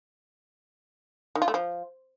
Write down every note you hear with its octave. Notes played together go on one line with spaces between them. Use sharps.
D#3
F4
A3
F3